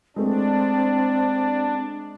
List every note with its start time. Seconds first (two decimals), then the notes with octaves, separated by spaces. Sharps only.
0.16 G#3 A3 C4 D4